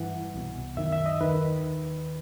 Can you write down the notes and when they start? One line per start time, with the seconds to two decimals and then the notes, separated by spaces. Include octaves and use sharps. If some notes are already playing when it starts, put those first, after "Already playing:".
Already playing: G2 E3 F#5
0.34 C2 B2
0.77 F#2 D#3 E5
0.92 E5
1.06 D#5
1.21 D#2 D#3 B4